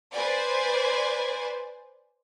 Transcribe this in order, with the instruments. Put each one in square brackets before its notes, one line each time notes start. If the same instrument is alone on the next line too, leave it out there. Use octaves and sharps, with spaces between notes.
[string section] B4 C5 D5 G#5